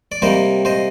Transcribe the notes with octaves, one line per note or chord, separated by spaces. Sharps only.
D5
C3 G3 A#3 C5 D#5
C5 D#5